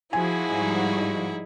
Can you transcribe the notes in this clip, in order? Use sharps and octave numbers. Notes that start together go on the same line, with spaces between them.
F3 E4 F#4 G#4 G#5
G#2 G3 D#4